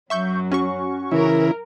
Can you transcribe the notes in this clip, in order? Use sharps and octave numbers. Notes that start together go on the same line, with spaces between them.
F#2 F#3 E5 C#6 G6
C#4 F#4 C#6
C#3 E3 E4 A#4